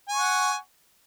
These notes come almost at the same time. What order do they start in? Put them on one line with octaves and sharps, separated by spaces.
G#5 C#6 F#5